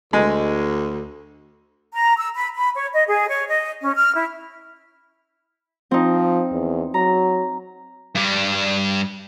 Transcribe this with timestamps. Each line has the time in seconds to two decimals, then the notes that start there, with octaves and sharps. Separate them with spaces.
0.13 D2 G#3
1.94 A#5
2.17 E6
2.35 B5
2.56 B5
2.76 C#5
2.93 D#5
3.07 G#4
3.28 C#5
3.47 D#5
3.83 C#4
3.95 F6
4.15 E4
5.91 F3 C4 D#4
6.52 E2
6.94 F#3 A#5
8.15 G2 G3